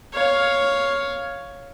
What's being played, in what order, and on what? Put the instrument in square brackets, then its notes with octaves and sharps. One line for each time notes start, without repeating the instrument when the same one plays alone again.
[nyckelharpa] C#5 F5